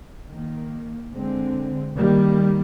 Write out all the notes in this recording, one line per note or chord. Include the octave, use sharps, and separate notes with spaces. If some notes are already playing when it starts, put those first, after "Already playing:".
D#3 A#3
D3 G#3 C4
D#3 G3 A#3